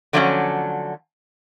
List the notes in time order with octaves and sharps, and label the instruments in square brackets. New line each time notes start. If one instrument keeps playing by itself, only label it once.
[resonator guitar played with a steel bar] D3 F3 F#3 A3 B3 C#4